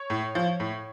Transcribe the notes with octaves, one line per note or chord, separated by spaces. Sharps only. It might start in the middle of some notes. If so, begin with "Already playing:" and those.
Already playing: C#5
A2
F3
A2